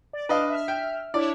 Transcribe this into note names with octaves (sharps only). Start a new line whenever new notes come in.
D5
D4 B4 D#5 F5
E5 F6
G5
D4 E4 C#5 D5